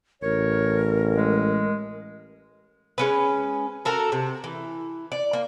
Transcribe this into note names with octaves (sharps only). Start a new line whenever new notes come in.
A1 A#4 C#5
G#3
G#3 C#4 B4
F#4 A4 A#4
C3
E3
D5
A#3